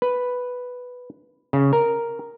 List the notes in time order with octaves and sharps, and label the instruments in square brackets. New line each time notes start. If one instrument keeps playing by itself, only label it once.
[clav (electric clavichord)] B4
C#3
A#4